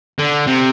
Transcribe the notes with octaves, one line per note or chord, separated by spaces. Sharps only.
D3
C3